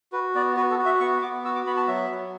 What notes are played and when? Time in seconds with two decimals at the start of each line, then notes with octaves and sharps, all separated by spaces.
0.12 F#4 B4
0.35 B3 D5
0.56 F#4 B4
0.71 A4
0.78 F#4
0.85 E5
1.00 B3 C#6
1.22 B3 D6
1.45 F#4 E6
1.55 D6
1.66 B3 B5
1.77 A5
1.88 F#3 E5
2.10 F#3